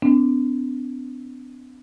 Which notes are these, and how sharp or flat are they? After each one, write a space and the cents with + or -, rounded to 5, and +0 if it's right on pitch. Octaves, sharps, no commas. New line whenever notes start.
B3 +40 D4 -20